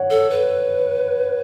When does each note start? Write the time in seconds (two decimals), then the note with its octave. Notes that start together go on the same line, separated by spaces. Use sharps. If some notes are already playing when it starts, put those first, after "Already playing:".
Already playing: C#5 F#5
0.10 A4
0.30 B4